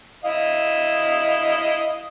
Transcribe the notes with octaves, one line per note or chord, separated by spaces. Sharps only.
E4 D#5 F5